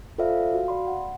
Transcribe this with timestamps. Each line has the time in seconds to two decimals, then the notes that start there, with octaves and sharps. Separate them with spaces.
0.18 F4 A4 C5 D5 E5 F5
0.53 F#4 F5
0.68 D5 B5 C6
0.87 F#5